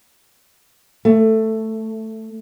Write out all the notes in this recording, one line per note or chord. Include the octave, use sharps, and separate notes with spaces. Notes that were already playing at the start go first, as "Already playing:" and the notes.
A3